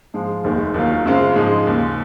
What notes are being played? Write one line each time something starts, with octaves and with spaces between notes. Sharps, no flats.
G#2 F3 G#3
F1 D#2 D#3 G#3
D#2 D#3 F#3 A#3 F4
F#2 C#3 G#3 C4 F4
G#2 F3 G#3 D#4
D#2 C#3 G#3